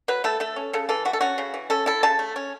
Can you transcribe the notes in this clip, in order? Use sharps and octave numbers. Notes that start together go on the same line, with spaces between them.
F#3 B4
A3 A4
A3 A4
C#4
C#3 A4
E3 A4
A3 F#4
A4
C#4 F#4
C#3
E3
C#4 A4
E4 A4
C#3 A5
A3
C#4